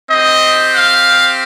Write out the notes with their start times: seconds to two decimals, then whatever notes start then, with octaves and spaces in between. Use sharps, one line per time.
0.10 C4 G4 D#5
0.74 F5